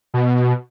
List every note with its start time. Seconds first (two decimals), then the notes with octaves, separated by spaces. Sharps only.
0.14 B2